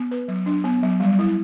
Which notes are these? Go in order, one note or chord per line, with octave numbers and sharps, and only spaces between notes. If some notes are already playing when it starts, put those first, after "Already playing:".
Already playing: B3
B4
F#3
D4
B3
F#3
G3
E4